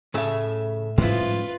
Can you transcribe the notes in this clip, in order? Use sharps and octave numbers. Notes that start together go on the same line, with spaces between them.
A2 C#3 A3 E5
G#2 F3 G3 C#4 E4 F4 B4